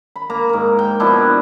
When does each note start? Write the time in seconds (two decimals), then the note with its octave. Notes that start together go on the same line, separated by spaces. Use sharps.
0.16 B5
0.30 A#3 A#5
0.49 G#2 A#4
0.79 G5
1.00 B2 F3 D4 E4